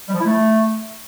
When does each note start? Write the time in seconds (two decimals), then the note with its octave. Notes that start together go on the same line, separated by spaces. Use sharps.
0.08 G3
0.14 F3
0.19 E4
0.25 A3